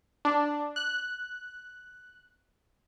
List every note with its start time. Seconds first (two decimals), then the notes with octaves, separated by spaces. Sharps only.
0.25 D4
0.76 F#6